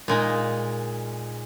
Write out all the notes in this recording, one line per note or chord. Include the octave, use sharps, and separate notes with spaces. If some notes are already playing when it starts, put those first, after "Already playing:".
A#2 G#3 D#4